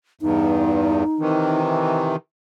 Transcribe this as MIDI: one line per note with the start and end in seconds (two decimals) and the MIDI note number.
0.21 1.04 40
0.21 1.04 43
0.21 1.60 63
1.20 2.16 48
1.20 2.16 51
1.20 2.16 52